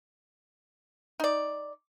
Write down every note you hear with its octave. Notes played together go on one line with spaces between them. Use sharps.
D#4 D5